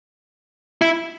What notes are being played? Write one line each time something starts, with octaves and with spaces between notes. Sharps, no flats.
E4